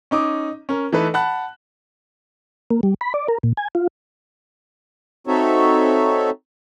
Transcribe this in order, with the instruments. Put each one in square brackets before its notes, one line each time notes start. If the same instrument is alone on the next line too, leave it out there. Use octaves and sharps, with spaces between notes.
[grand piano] C#4 D#4 D6 D#6
C#4 A#4
E3 A3 D#4 A4 B4
F#5 A5 B5 F#6
[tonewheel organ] A#3
G3
B5
D5
A#4
A#2
G#5
F4
[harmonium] C4 D#4 F#4 A4 C#5 E5